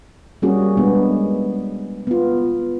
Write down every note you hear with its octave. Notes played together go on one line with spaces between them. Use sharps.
G3 A#3 C#4 F#4 G#4
G3 G#3 B3 D4
B3 F4